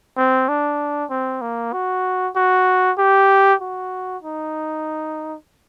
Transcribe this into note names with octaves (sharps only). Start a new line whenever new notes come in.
C4
D4
C4
A#3
F#4
F#4
G4
F#4
D#4